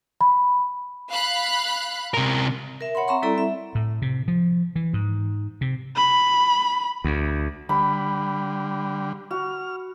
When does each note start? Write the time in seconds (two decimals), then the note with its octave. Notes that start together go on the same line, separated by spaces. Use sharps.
0.21 B5
1.11 F5 B5 F#6
2.14 C3 A#4
2.81 A#4 E5
2.95 C#5 F#5 B5 C6
3.08 C4 E5 A#5 C6 C#6
3.22 G3 C4 E4 A4 D5 A#5
3.38 E5
3.75 A2
4.02 C3
4.28 F3
4.76 E3
4.93 G#2
5.61 C3
5.96 B5
7.04 D2
7.69 D3 G3 B5
9.31 F#4 F6